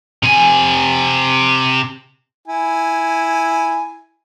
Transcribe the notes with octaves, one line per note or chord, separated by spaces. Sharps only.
C3 G#5
E4 G#5